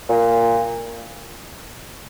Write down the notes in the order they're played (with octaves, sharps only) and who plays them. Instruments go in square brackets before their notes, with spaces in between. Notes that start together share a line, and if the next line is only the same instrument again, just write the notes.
[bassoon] A#2